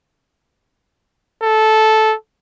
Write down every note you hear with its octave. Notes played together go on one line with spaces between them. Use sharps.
A4